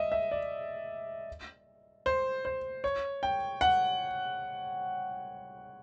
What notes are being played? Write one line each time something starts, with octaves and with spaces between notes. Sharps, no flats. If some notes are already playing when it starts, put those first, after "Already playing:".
Already playing: D#5 E5
E5
D5
C5
C5
C#5
G5
F#5